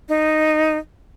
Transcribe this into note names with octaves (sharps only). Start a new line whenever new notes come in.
D#4